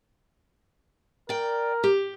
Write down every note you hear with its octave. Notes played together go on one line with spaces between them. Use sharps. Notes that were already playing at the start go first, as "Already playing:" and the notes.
A#4 D5 G5
G4